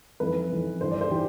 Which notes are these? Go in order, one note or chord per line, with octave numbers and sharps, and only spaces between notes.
F2 E3 B4
F2 E3
G2 E3 C5
D5
C5
E3 G4